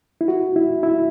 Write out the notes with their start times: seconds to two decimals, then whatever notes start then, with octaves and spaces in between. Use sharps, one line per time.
0.21 E4
0.28 F#4
0.56 E4
0.83 E4